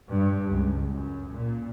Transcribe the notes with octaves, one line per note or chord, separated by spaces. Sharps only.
G2
C#2
F#2
A#2